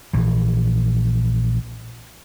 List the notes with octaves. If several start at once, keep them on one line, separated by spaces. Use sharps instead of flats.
A#1 E3